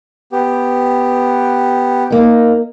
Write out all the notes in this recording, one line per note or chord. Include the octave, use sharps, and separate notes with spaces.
B3 G4
A#3 D#4